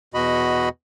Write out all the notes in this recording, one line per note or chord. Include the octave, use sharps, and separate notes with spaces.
E2 B2 F#4 D#5 B5